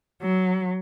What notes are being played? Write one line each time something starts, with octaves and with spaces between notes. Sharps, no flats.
F#3